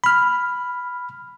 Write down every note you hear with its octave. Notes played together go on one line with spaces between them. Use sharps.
B5 F6